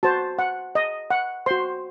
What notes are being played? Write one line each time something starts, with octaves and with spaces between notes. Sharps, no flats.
F#4 C5 A5
F#5
D#5
F#5
F#4 C5 C6